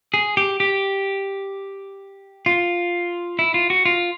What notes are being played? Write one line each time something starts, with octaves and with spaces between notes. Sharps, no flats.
G#4
G4
G4
F4
E4
F4
F#4
F4